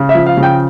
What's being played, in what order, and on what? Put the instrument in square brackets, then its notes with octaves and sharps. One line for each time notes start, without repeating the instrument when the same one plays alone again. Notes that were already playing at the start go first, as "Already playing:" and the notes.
Already playing: [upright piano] C#3
E5
F3
F5
C#3
G5